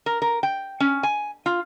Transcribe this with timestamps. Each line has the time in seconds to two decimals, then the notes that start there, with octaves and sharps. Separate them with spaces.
0.06 A#4
0.22 A#4
0.43 G5
0.80 C#4
1.03 G#5
1.46 F4